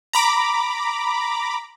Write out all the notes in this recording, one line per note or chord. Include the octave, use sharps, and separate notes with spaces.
A#5 B5 D6